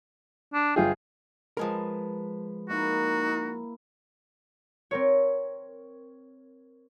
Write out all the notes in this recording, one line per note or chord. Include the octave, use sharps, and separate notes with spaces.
D4
G1 F4 G#4 G5
F3 G#3 A#4 B4 A5
A#3 D#4 E4 F#4
C4 A#4 C#5